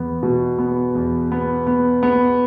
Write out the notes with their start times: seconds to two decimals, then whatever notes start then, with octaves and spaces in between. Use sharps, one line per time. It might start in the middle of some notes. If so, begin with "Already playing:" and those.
Already playing: E2 B3
0.23 B2
0.58 B3
0.95 E2
1.32 B3
1.67 B3
2.03 B3